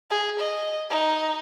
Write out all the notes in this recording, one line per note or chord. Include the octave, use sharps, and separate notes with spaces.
G#4
D#5
D#4